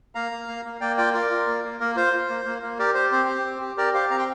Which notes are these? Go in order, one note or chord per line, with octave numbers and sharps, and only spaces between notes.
A#3 F5 A#5
A#3
A#3
A#3
A#3 D5 G5
F4 D5 G5
F4 A#4 D5
F4
A#3
A#3
A#3 A#4
F4 C5
F4
A#3
A#3
A#3
G4 A#4 D5
G4 C5
C4 C5
G4
C4
G4
G4 A#4 D5
G4 C5 F5
C4 F5 A#5
G5 C6